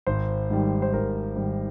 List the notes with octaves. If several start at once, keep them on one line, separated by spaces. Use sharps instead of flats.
G#1 C5
G#2 D#3 G3
C5
G#1 A#4
G#2 D#3 G3